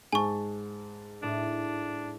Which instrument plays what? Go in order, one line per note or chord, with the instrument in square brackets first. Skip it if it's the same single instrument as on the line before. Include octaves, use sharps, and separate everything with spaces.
[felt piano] G#2 A5 [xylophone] G#5 C#6
[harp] A2 [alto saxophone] D4